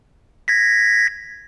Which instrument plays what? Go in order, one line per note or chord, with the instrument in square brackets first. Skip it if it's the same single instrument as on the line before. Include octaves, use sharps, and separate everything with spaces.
[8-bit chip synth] G#6 A#6 B6